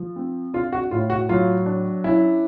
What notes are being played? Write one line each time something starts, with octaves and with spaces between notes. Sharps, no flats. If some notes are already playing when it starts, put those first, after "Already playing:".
Already playing: F3
C4
D4 F4
F#4
A2 F4
F#4
F#3 F4
D4
C#4 E4